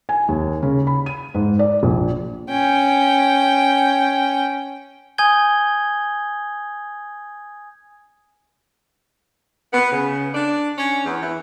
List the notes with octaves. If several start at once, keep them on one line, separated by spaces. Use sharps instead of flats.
G#5
D#2
C#3
B5
D#7
G#2
D5
A#1
C#4 G5
G#5 D#6 G6 G#6 G7
B3
C#3
D4
C#4
E2
E3